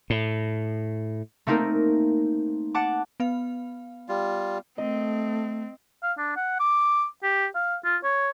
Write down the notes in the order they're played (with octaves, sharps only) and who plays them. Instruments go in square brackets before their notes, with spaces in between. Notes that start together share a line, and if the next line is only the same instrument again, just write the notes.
[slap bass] A2
[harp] A3 A#3 C4 D#4 A#4
F#5 A5 D6
[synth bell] B3 F5
[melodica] G3 F4
[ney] A3 [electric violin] C4 [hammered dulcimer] D#5
[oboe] F5
D4
F#5
D6
G4
F5
F4
C#5